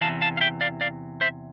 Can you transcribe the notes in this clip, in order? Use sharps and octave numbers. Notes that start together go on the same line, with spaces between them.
E2 C3 E3 F5 A5
F5 A5
F5
E5 G5
D5 F5
D5 F5
C5 E5